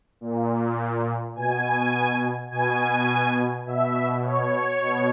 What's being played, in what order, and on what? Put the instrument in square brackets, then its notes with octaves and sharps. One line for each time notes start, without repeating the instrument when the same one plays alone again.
[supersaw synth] A#2
B2 G#5
B2 G#5
B2 E5
C#5
B2